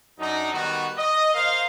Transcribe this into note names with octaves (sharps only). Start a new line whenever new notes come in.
F#2 D4 D#4
D#3 G3 B3 F#4
D#5
A#4 C5 F5